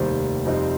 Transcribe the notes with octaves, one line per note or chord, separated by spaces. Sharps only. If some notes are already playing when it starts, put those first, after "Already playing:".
Already playing: F1 D#2 D#3 G3 C5
F2 C3 G3 C4 D#4